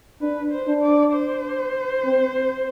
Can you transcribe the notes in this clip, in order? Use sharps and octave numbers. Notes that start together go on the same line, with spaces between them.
D4 B4
C5
D4
D5
C5
C4